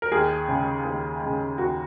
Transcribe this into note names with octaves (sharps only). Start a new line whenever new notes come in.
A#4
D#2 G#4
C#3 G#3
D#2
C#3 G#3
D#2 F#4